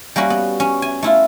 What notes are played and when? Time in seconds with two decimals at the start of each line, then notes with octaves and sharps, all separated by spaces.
0.16 G3 A#3 C#4 F#4
0.30 B3
0.60 C#4
0.82 G#5
1.03 A3 E4 F4